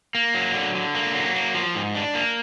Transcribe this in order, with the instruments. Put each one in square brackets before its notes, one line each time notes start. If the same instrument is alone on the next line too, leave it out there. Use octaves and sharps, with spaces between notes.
[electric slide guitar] A#3
F#3
D3
D3
A#3
F#3
A#3
F3
G#2
D4
A#3